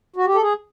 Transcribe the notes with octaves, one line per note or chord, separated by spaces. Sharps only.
F#4
G4
A4
G#4